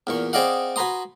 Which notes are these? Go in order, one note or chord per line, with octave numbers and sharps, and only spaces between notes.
E2 A#2 C#6
C4 G#4 D5 D#5 F5 F#5
F#4 B4 G#5 A#5 C6 D#6